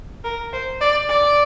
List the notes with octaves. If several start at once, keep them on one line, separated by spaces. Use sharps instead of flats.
A#4
C5
D5
D5